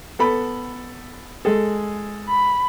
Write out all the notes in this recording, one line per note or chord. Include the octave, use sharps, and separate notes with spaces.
B3 A4 B5
G#3 G#4 A4
B5